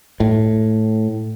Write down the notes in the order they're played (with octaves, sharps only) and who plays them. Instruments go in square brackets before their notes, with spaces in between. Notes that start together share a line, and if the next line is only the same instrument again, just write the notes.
[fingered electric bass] A2